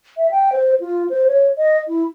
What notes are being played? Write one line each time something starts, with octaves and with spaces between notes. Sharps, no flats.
E5
G5
C5
F4
C5
C#5
D#5
E4